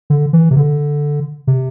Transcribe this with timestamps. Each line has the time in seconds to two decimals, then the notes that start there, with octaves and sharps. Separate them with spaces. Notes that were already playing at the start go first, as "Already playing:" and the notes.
0.10 D3
0.33 E3
0.51 C3
0.56 D3
1.47 C3